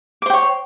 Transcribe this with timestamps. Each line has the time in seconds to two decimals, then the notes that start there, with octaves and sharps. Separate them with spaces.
0.22 D6
0.26 C5
0.30 G5
0.34 C#5